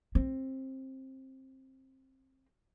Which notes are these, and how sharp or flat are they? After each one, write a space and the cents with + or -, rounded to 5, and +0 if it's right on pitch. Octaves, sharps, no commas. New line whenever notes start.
C4 +20